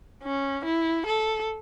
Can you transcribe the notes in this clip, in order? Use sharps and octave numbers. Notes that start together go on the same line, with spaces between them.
C#4
E4
A4